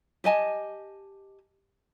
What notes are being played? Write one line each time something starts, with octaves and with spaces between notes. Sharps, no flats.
G4 D#5 G#5 A5